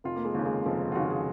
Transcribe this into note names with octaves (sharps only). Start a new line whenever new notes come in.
F1 F4
A#3
G#3
D#2 C#3
G#3
F1 F3
F4
D#2 C#3 F#4
G#4